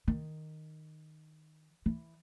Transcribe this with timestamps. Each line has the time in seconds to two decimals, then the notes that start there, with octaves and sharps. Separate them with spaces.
0.08 D#3
1.86 E3